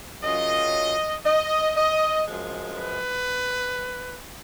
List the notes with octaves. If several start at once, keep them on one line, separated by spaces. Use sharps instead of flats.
F#2 C#3 F#3 C#4 F4 D#5
D#5
D#5
F#2 F3 G#3
B4